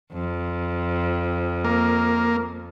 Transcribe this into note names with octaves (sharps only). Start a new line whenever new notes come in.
F2
A#3